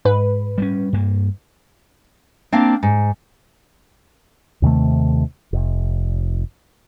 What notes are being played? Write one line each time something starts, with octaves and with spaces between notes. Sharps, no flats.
G#2 B4
G3 A3 C#4
G2 A#3
A#3 C4 D4 F5
G#2
D#2 C3 D#3 A3
F1